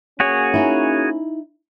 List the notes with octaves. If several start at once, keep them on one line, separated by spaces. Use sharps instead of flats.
A#3 C#4 F#4 G#4 C#5
D#4 E4